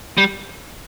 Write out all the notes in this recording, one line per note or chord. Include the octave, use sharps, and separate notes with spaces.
G3